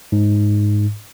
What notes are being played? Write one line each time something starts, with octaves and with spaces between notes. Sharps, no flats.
G#2